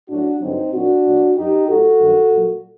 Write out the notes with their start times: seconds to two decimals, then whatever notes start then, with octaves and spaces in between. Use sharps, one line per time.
0.09 A2 F#3 D4 F#4
0.41 G2 D3 F#3 C4 D#4
0.73 A#2 F#3 D4 F#4
1.05 A#2 F#3
1.36 F#2 F#3 D#4 G4
1.68 A2 F#3 F#4 A4
2.00 G2 D#3 F#3
2.31 A#2 F#3